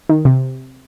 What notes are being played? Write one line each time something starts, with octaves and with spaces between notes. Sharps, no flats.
D#3
C3